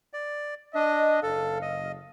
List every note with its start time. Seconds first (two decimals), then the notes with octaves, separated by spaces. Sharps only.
0.13 D5
0.75 D4 D#5
1.23 F#1 A4 F5
1.62 D#5